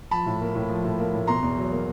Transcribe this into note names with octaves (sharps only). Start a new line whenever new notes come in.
F3 A5 B5
A2
A#3
A2
F3
A2
A#3
A2
B2 A#5 C6
E2
F#3
A#3